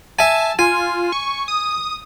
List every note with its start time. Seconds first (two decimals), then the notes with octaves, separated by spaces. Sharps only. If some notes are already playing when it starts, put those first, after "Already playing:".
0.19 E5 G#5 A5
0.59 F4 G#5
1.12 C#6
1.48 D#6